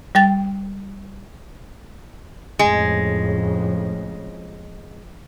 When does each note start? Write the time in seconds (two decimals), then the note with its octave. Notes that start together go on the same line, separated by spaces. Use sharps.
0.15 G3 G5 A6
2.59 F2 A2 C#3 G#3